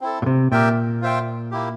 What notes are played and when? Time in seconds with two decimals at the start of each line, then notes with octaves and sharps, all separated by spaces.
0.01 C4 E4 A4
0.22 A#2
0.26 C3
0.52 A#2 G4 A#4 E5 G5
1.02 F4 C5 E5 G5
1.51 A#3 E4 G4